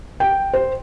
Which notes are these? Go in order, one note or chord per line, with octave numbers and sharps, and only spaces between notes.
G5
C5